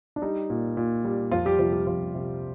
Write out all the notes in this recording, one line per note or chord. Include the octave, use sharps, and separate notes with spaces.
D4
G3 D#4
A#2
A#2
G3
F2 F3 F4
G3 G4
C3 F3 F4
G3 G4
F2 F3 F4
C3